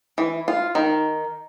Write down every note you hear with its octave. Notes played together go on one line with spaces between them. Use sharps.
E3
F4
D#3